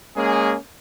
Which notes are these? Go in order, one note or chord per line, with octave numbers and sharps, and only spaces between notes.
G#3 A#3 C#4 G#4